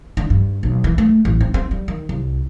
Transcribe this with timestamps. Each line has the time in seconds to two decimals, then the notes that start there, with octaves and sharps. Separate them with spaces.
0.17 D3
0.30 G2
0.63 B1
0.84 E3
0.98 A3
1.25 A1
1.41 C4
1.54 C4
1.71 G3
1.88 D#3
2.09 C2